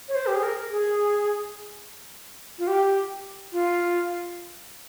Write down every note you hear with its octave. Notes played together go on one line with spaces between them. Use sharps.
C#5
C5
G4
G#4
A#4
G#4
F4
G4
F4